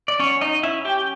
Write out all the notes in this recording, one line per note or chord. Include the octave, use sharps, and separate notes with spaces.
D5
F#3 C#4 C#5
D#4 D#5
C#4 E4 E5
G4 G5